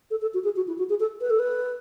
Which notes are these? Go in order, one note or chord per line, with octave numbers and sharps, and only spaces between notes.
A4
A4
F#4
G#4
F#4
E4
F#4
G#4
A4
B4
A4
B4